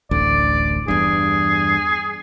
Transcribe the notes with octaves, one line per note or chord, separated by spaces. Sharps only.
D1 A1 D2 D5
E2 G2 G#4